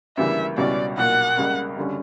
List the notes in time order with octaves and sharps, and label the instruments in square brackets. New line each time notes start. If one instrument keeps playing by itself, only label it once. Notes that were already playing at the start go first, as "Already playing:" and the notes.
[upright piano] D2 C#3 E3 G3 A#3 [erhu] E5
[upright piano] C#2 B2 G3 C#4 E4 [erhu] D5
[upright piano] B1 A#2 A#3 [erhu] F#5
[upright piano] C#2 C#3 G3 A#3
F#1 D3 G3 C#4